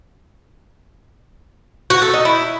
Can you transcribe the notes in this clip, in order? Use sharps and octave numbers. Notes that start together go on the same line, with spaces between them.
F#4
A4
D#4
E4